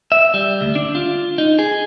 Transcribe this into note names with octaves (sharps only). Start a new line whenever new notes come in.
E5
G3
D2
D4
F4
D#4
G#4